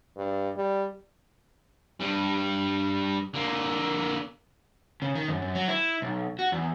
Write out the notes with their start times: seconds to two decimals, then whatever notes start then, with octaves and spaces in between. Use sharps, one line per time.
0.17 G2
0.56 G3
2.00 G2 G3
3.34 D3 A#3
5.02 C#3
5.15 D#3
5.28 F#2
5.42 F#2
5.55 F#3
5.68 E4
6.02 B1
6.39 F#4
6.52 E2